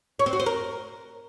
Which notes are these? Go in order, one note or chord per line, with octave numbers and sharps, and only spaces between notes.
C#5
C4
F#4
C5
A#4